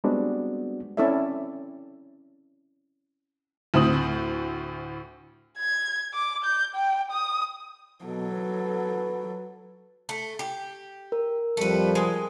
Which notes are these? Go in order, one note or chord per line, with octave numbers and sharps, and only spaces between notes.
G3 G#3 B3 C4 D4 F#4
C4 C#4 E4 A4 D5 E5
D2 A2 C4 D#6 F#7
G#6
D6
G6
G5
D#6
B2 F#3 A4
B4
A3
G4
A#4
F2 F3 G3 A3 B4
G#3